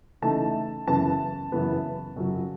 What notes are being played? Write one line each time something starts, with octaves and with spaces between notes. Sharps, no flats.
C#3 E3 A3 D#4 A5
F#2 C#3 E3 B3 A5
F#2 C#3 E3 B3
F#2 C#3 F#3